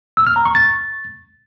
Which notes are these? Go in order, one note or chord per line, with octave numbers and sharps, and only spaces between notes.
E6
F6
A#5
C#6
A6